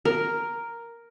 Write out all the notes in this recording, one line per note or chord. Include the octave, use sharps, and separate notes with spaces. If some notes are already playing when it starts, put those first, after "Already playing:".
A#4